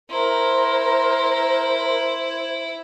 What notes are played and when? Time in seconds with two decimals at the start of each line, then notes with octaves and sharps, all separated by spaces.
0.10 E4 A#4 C5 A#5 C6